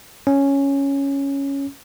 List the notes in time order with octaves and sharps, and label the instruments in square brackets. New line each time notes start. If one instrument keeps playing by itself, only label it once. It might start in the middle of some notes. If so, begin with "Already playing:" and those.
[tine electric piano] C#4